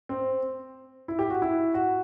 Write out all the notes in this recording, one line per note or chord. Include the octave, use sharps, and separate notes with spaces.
C4
E4
G4
F#4
E4
F#4